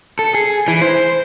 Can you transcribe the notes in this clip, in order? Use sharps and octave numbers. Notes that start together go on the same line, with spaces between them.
A4
G#4
E3
C5